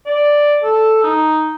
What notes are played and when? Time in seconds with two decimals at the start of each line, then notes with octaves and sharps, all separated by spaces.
0.06 D5
0.63 A4
1.03 D#4